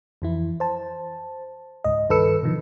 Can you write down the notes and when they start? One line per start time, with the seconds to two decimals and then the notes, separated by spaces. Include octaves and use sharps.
0.22 F2 E3 E4
0.60 C5 A5
1.84 C#2 G#2 D#5
2.09 G2 D#3 A4 B4 E6 C#7
2.42 G#2 B2 D3 D#3 F3